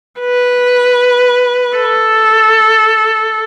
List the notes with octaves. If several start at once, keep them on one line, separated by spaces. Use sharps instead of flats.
B4
A4